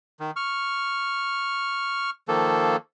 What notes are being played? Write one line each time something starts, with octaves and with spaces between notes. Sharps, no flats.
D#3
C#6 F6
D#3 F3 A#3 A4